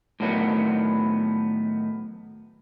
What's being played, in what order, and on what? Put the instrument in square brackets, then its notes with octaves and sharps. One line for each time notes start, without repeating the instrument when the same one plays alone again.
[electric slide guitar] A2 D#3 F#3 B3